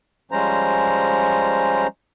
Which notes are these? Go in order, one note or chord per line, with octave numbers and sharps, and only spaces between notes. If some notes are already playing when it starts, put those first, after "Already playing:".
F3 G3 G#3 C#4 C5 A#5